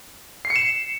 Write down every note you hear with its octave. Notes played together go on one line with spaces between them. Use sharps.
C7
C#7
E7